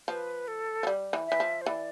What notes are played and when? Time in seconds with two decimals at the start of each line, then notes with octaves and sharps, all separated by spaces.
0.08 F3 B4
0.48 A4
0.83 F3
0.87 G3
1.13 E3
1.27 E3 E5
1.40 F3
1.62 C5
1.66 E3 D5